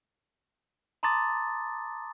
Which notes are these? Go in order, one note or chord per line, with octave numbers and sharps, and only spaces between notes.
A5 A#5 C6 D6 D#6 A6